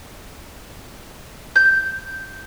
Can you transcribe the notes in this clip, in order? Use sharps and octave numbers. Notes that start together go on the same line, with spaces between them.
G6